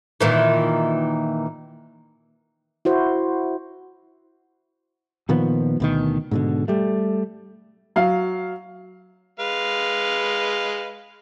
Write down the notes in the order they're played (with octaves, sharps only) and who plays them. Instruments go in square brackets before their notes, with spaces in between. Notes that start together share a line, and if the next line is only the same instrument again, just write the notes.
[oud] A#2 D#3 E3
[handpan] E4 F#4 C5
[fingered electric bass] A#2 D#3 F3 B3
D2 B2 D#3
G#2 B2 D3
G3 A3
[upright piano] F#3 F5
[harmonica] G#3 B4 F5